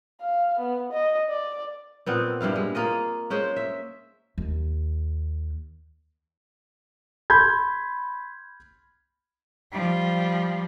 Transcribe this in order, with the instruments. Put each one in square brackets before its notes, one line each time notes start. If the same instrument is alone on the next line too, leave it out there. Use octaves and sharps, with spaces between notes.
[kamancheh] F5
B3
D#5
D5
[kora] A#2 B3 C4
G2 G3 E4 F5
G#3
A#3 F4 D#5
G#3 C#4 C5
E5
[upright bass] D#2
[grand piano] B5 C6 G6 G#6
[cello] F3 G3